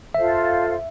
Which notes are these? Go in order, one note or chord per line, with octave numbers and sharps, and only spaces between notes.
F4 A4 C5 E5 F5